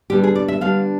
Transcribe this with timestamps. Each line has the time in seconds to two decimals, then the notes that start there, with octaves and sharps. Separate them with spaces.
0.10 D3 G3 B3 D4 G4
0.24 G#4
0.36 D5
0.48 E5
0.61 D3 G3 B3 D4 F5